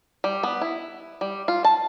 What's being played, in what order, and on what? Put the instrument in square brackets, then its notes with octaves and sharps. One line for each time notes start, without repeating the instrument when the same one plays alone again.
[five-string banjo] G3
B3
E4
G3
F4
A5